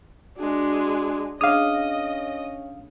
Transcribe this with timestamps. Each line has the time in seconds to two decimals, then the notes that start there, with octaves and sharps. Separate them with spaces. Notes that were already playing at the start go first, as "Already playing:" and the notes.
0.38 G#3 D4 F#4
1.41 C#4 D4 G#4 D#5 F5 D#6